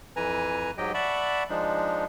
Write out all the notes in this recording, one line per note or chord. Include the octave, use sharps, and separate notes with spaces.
F2 E3 B4 G#5 A#5
G#2 F#3 G4 D#5 G5
D5 E5 F#5 A5 B5 C#6
F3 G#3 D4 D#4